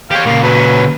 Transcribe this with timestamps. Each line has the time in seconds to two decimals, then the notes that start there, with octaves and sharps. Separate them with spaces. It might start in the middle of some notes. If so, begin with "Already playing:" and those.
0.11 G4 C#5 F5 G5
0.26 A#2 C#3 A#3
0.43 F#3 C#4 B4